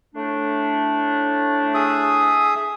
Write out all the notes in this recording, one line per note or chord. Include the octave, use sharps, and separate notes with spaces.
A2 A3 D4
G#4 E5 D#6